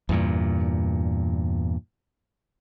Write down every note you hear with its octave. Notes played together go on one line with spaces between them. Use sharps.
E2 G2 A#2